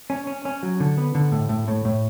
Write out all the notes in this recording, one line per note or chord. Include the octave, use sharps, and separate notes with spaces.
C#4
C#4
C#4
F#3
D3
B3
D3
A2
A2
A2
A2